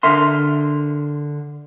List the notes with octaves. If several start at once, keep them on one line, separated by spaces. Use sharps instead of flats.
D3 A#4 E5 C6